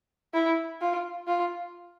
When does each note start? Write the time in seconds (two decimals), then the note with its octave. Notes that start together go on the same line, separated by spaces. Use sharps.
0.34 E4
0.81 F4
1.27 F4